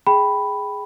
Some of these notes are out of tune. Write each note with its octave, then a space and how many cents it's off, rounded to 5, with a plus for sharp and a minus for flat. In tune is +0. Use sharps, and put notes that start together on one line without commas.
G#4 +0 G5 +0 B5 +0